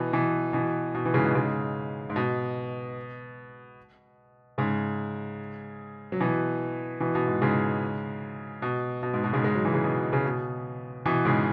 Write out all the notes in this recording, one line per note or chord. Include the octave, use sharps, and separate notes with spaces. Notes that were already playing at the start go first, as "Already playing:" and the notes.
Already playing: B2 E3
B2 E3
B2 E3
B2
E3
G#2 C#3
B2
G#2 C#3
G#2
B2
G#2 C#3
F#3
B2 E3
B2 E3
B2
G#2
G#2 C#3
B2
B2
G#2
B2
G#2 C#3
G#3
F#3
E3
C#3
B2
C#3
B2
B2 E3
G#2 C#3